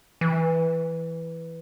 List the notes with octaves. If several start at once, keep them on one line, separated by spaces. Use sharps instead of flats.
E3